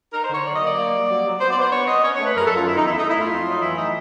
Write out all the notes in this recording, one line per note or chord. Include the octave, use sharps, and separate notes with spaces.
D#4 A#4
C5
D3 C#5
F#3 D5
D#5
A#3
D5
A#3
G3
F#3
F#3
B3 C5
D5
B3 C5
D4 C#5
B3 D#5
C#4 C#5
C#5
A3
B4
F#2 A#4
G#4
A4
F#2
F4
D#3 E4
D#4
E2
E4
A3 D#4
E4
A3 F4
F2
F#3
D#4
E3 E4
A2 D#4